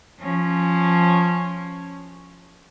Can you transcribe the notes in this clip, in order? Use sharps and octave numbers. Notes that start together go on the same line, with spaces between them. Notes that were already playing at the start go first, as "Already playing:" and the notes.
F3 C#4